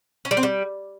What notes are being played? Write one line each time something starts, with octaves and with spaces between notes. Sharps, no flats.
C#4
G3
C4
G3